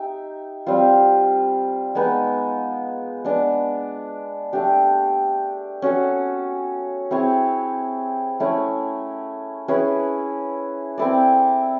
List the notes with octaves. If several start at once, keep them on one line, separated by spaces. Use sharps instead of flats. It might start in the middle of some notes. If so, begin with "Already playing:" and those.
Already playing: D#4 G4 E5
G3 C4 F4
G#3 B3 D#4
G#3 B3 D4
A3 D4 G4
C#4 F#4 A4
C4 E4 G#4 C#5
A3 C#4 E4
C#4 E4 G#4 B4
C4 E4 A4 D5